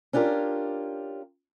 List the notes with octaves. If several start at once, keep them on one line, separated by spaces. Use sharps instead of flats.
C#4 D4 F4 G4 A#4